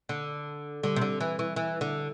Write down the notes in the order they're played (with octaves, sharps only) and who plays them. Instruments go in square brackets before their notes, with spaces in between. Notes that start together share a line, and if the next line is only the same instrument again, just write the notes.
[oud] D3
[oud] D3 [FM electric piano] G3
[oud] C3
D3
E3
E3
E3
D3